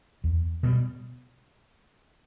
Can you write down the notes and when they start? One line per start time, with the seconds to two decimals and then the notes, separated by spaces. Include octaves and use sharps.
0.24 E2
0.63 B2 G3